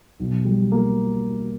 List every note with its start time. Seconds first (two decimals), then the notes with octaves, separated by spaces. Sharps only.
0.20 B1
0.45 G3
0.72 A#3